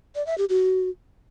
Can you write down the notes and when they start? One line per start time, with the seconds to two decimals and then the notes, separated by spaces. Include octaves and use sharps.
0.15 D5
0.27 E5
0.38 G4
0.49 F#4